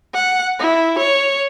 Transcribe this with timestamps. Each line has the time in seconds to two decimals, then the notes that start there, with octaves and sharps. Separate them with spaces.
0.14 F#5
0.60 E4
0.99 C#5